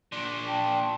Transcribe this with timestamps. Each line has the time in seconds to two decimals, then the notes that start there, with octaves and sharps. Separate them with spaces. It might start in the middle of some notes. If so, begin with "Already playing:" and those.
0.12 A#2 D4
0.46 G5 A5